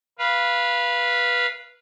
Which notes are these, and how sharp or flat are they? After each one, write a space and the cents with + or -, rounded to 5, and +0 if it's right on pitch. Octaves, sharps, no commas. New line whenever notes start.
B4 -15 F5 -10